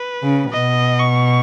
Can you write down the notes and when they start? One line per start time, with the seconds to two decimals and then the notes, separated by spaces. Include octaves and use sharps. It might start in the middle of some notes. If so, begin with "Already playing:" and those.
Already playing: B4
0.22 C#3
0.53 B2 D#5
0.99 C#6